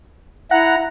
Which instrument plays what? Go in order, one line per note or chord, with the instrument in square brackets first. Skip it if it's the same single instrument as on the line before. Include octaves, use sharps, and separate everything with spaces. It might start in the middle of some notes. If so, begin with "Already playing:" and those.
[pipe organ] E4 A#5 [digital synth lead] F#5